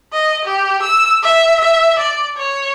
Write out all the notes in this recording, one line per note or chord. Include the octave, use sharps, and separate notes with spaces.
D#5
G4
E6
E5
E5
D5
C#5